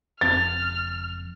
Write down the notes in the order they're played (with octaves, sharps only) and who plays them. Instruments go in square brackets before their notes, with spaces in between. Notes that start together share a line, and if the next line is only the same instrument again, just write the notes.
[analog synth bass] F#1 [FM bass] F2 [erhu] F6 [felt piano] A6